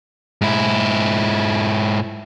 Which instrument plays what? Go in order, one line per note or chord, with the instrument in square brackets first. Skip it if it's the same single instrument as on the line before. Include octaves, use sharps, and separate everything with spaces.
[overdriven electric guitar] G#2 E4